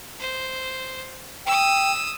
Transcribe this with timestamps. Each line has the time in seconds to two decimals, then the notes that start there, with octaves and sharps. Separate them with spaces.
0.19 C5
1.46 G5 D#6 E6